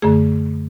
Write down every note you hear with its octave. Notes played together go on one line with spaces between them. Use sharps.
F#2 D3 A3 G#4